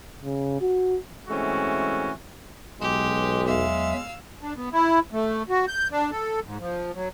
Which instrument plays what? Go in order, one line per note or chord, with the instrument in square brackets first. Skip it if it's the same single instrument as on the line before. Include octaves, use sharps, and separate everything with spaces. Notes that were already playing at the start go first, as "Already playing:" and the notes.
[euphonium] C#3
F#4
[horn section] E3 G#3 A3 C4 C#4 F#4
[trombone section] B1 [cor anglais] G#3 [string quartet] G4
[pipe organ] E2 F#3 E5 [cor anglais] G#3 [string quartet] F5 E6
[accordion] D4
B3
E4
A3
F#4
G6
D4
A4
G#2
F3
F#3